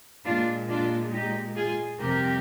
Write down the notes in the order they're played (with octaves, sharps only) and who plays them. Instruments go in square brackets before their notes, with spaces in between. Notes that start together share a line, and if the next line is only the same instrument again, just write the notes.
[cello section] A#2 G#3 D4 F4
D4 F4
D#4 G4
F4 G#4
F2 C3 G3 G4 A#4